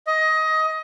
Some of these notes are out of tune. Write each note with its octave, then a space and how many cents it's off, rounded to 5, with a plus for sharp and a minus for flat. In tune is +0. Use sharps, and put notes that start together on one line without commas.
D#5 +20